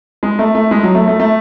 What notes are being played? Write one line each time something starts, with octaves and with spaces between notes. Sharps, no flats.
G#3
A3
A3
G#3
F#3
A3
A3
A3